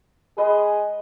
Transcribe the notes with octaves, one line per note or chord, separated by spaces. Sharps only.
G#3 G#4 B4 D#5